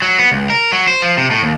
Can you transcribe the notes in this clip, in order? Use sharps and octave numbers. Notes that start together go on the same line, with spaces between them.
F#3
B3
C#2
A#4
F#3
C5
F3
C3
A2
D#2